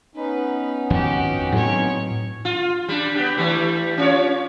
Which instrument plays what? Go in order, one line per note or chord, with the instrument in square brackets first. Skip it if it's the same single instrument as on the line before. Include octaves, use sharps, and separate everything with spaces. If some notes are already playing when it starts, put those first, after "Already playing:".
[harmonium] B3 C#4 D#4 [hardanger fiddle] B4
[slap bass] G#1 F2 F3 [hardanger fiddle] F#4 G4
[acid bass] A2 [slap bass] F#3 [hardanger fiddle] C4 C#5
[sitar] F4
G3 D4
B3 G4
E3 G3 A3
C#4 F4 C#5